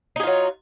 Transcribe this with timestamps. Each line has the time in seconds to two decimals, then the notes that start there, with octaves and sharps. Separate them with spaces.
0.16 D#4
0.20 G#4
0.23 F4
0.27 F#3